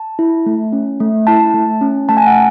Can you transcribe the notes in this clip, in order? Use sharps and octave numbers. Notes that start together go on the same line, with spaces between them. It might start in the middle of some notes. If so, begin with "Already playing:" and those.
Already playing: A5
E4
A3
C#4
A3
E4 A5
A3
C#4
A3 A5
G#5
F#5